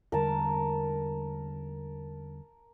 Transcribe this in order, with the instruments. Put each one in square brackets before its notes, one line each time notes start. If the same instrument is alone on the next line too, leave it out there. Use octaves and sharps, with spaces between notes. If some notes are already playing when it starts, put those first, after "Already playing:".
[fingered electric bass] E2 D3 G3 [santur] A#4 A5